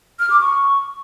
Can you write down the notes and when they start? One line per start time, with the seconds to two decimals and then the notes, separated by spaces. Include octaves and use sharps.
0.20 F6
0.30 D6
0.41 C#6